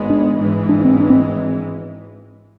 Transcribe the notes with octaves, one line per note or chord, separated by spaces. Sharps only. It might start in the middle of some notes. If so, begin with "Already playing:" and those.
Already playing: G#1 G#2 G#3 B3
D4
G#1 G#2 E3 G#3
D4
C4
D4
C4